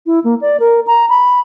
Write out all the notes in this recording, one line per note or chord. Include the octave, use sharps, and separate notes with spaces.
E4
A#3
D5
A#4
A#5
B5